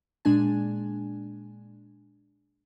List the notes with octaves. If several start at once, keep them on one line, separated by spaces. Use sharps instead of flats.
A#2 G#3 D4 G#5